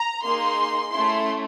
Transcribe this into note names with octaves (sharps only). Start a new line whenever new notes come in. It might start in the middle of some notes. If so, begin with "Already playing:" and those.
Already playing: A#5
A#3 D#4 G#4 C6
A3 C#4 E4 C6